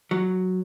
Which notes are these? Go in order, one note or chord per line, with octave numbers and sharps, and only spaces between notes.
F#3